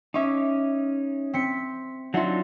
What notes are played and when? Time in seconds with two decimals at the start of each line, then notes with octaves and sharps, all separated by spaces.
0.14 C#4 D#4 E5 C#6 D6
1.33 C4 B6 C#7
2.14 F#3 D4 D#4 F4 E5 F#5